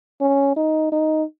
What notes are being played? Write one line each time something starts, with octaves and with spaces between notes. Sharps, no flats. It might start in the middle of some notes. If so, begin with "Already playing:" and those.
C#4
D#4
D#4